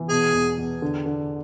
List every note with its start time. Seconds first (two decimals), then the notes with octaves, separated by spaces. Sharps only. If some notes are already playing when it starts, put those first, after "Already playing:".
Already playing: E3
0.09 B2 G#4
0.33 E2
0.58 E2
0.82 D3
1.06 D3